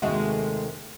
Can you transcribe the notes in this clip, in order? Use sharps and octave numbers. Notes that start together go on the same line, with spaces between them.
D#2 C3 D#3 G#3 A3 F#4